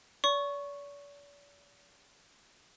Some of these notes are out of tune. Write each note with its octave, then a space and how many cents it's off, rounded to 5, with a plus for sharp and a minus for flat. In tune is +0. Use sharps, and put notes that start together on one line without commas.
D5 -45 C#6 +0